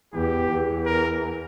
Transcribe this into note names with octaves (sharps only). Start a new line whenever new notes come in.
E2 G4
E2
A#4